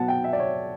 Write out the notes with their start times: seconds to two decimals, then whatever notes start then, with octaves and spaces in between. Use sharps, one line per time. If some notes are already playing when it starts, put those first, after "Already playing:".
Already playing: B2 F#3 B3 F#5 A5
0.08 G5
0.24 E5
0.33 D5
0.39 C#5